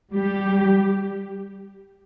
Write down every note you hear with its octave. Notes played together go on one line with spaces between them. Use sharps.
G3 G4